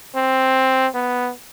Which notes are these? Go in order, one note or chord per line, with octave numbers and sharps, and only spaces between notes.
C4
B3